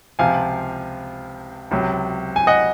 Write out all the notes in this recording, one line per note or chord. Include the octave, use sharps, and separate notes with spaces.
C#2 C3 F3 F5 G#5
C#2 C3 F#3
G#5
D#5 F#5